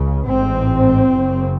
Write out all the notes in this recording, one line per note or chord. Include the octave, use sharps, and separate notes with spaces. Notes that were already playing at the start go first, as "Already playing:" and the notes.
Already playing: C#2 C#3
A1 G#2 C4
F#1 F#2 C#3